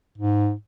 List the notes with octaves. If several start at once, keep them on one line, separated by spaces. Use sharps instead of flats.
G#2